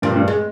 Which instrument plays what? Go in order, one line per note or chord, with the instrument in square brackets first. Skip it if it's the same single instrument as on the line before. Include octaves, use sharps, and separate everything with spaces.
[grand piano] G2 A#2 [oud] C4
[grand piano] G2
[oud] G#3